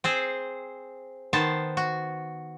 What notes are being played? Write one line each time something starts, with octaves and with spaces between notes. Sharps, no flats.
C4 G#4 C5
D#3 B3 C5 A5
F#4